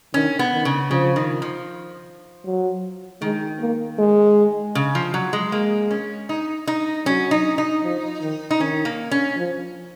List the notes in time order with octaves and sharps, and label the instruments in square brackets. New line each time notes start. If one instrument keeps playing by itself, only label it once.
[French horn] D#3 [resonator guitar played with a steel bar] C#4
[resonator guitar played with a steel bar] B3
[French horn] D#3
[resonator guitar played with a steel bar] C#3
[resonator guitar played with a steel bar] C#3 [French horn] F3
[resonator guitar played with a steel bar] D#3
F3
[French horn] F#3
[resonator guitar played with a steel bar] D#3 [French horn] G#3
[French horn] A#3
G#3
[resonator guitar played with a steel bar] C#3
F3
F#3
G#3
[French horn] G#3 [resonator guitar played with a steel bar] A#3
[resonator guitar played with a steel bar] C#4
D#4
D#4
[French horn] F#3 [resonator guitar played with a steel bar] C#4
[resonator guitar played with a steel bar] D#4
D#4
[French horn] F3
D#3
[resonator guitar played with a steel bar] D#4
[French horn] D#3 [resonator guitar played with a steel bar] C#4
[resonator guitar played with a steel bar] A#3
C#4
[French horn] F3